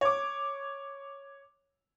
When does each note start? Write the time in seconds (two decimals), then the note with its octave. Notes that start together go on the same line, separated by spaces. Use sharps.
0.01 C#5 D6